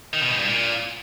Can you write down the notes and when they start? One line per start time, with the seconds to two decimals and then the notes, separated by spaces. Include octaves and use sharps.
0.14 D#3
0.22 B2
0.31 G#2
0.39 G2
0.48 A#2